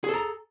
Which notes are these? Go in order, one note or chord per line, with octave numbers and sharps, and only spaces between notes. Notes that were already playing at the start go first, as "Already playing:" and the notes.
G#4 A4 A#5